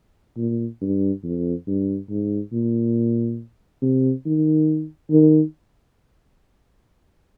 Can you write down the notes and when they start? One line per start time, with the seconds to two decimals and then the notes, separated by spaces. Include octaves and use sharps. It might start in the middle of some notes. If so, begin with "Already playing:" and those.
0.37 A#2
0.81 G2
1.24 F2
1.67 G2
2.10 G#2
2.52 A#2
3.82 C3
4.26 D#3
5.11 D#3